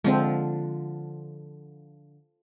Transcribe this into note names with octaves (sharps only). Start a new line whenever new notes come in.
D3 F3 G#3 C4